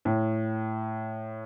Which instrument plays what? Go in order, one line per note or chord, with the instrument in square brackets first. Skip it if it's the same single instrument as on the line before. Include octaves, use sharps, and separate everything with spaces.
[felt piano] A2